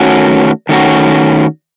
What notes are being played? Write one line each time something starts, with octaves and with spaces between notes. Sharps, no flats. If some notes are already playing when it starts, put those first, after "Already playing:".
Already playing: D#3 A3 C#4 F#4
D#3 A3 C#4 F#4